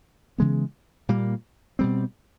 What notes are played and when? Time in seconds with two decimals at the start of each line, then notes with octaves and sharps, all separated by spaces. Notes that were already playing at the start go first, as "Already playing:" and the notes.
0.38 C#3 E3 G#3 B3
1.09 A#2 G3 A#3
1.79 B2 G3 C4